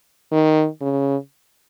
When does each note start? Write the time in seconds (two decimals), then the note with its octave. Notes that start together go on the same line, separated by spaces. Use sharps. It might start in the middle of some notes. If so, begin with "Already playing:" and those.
0.32 D#3
0.82 C#3